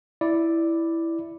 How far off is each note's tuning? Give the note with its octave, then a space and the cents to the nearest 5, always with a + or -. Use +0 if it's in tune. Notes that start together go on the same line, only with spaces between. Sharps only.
E4 +0 D5 +0